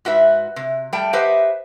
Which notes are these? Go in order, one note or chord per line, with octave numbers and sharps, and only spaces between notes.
G#2 F#4 B4 E5
C3
G3 A3 G5 A5
G4 B4 C5 D#5 E5 F#5